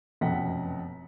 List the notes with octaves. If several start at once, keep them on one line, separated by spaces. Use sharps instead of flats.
F1 F#2 B2 F#5 G5 B6